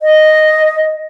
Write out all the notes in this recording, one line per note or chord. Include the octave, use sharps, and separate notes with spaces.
D#5